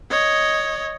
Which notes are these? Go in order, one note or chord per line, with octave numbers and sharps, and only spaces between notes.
C#5 D#5